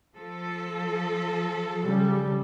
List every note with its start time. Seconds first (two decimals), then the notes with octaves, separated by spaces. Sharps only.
0.16 F3 A4
1.82 C#3 G3